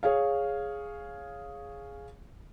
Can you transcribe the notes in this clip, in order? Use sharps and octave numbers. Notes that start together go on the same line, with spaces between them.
G#4 C#5 F5